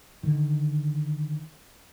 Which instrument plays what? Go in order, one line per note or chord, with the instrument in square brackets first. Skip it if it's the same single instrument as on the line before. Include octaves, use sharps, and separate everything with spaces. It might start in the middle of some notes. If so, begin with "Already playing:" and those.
[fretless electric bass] D3 D#3